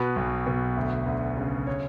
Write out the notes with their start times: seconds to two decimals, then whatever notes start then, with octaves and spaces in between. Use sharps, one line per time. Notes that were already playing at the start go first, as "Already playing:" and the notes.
Already playing: B2 B4
0.16 B1
0.47 B2
0.77 D2
1.07 D2
1.37 C#3
1.67 C#5